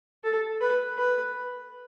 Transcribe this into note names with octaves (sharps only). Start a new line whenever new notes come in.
A4
B4
B4